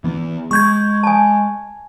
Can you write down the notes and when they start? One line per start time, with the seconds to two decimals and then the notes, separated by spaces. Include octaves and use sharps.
0.04 E3 B3
0.51 G#3 C#6 G6 G#6
1.03 G#5 A5